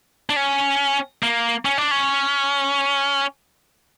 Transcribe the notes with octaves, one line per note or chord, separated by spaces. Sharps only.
D4
C#4
A#3
C#4
D4
C#4